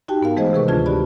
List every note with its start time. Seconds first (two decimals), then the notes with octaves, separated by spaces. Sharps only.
0.08 D#4 F#4 G4 G5 A5
0.21 G#2 B3 A#4 F5
0.36 E3 G#3 A3 G#4 C5 D#5
0.53 C3 D#3 G#4 A#4 B4 C#6
0.68 D2 D3 D4 F4 A5 G#6
0.86 F#4 G4 D5 B5